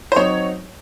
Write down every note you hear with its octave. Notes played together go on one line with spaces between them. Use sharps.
C5
F#3 C4 D#4 C#5